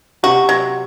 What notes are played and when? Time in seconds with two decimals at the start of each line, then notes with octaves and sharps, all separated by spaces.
0.23 C3 F#4
0.49 F#3